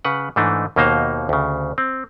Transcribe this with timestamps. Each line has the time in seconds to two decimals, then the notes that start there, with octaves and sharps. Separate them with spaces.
0.05 C#3 B4 F#5
0.36 G#2 E3 A3 D4 D#4
0.76 D#2 B2 A#3 D#4 C5 F5
1.29 D2 C#3
1.78 C4